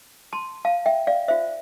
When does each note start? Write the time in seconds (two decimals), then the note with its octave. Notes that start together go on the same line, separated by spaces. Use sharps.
0.33 A5 C6
0.65 F5 A5
0.86 E5 G5
1.07 D5 F5
1.28 F4 C5 E5